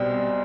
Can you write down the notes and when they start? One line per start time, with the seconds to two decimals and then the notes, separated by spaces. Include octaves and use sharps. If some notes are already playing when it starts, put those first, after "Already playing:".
Already playing: B1 B2 G3 C4 D5